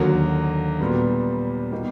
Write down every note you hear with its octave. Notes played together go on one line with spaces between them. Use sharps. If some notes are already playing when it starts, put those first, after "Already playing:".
Already playing: D#2 D3 F#3 A#3
A#2 G3 B3
B2 G3 A#3 D#4